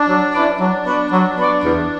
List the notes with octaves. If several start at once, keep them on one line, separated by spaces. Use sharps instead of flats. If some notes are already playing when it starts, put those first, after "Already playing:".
Already playing: D4
F#3
C#4 E4 B4 D5
F#3 D4
B3 F#4 B4 D5
F#3
B3 F#4 B4 D5
E2